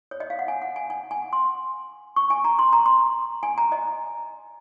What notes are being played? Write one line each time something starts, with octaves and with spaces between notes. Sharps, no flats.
C#5
D#5
F5
F#5
G#5
F#5
G#5
G#5
G#5
C6
C#6
G#5
A#5
C6
A#5
C6
G#5
A#5
D#5